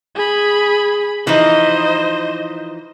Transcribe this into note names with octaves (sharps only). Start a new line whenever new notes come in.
G#4 B5
E3 F3 D#4 C5 D#5